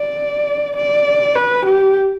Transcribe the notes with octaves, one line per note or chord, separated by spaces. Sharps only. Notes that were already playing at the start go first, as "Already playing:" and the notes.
Already playing: D5
D5
B4
G4